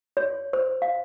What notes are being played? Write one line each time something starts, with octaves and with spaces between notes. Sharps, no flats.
C#5
C5
F5